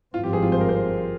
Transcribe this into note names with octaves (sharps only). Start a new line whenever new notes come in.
G#1 G2 F3 C4 F4
G4
G#4
F4
C5
A#4
C5